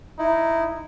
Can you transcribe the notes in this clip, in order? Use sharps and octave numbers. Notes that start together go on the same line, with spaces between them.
D#4 E4